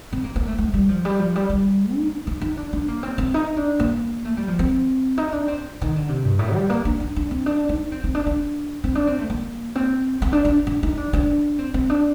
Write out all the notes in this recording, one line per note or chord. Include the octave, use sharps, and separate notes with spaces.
C4
A#3
A#3
A3
A3
G3
F3
G3
F3
G3
G3
D#4
D#4
D#4
D4
D4
A#3
C4
C4
D#4
D4
A#3
A3
G3
F3
C4
D#4
D4
C4
D#3
D3
C3
G2
A2
G3
A#3
D4
D4
D4
C4
D4
D#4
C4
C4
D4
D4
C4
D4
C4
A3
A#3
C4
C4
D4
D4
D4
D#4
D4
D4
C4
C4
D4